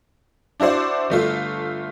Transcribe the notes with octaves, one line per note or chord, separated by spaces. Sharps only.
D4 E4 F#4 C5 D5
G1 A3 F4